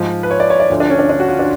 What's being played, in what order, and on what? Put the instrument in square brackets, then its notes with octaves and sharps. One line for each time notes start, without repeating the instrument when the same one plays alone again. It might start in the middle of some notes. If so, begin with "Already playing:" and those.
Already playing: [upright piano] G#2 F3
B4
C#5
D5
C#5
D5
D2 D3 F3
D4
C#4
D4
D4
F#4
F4
D4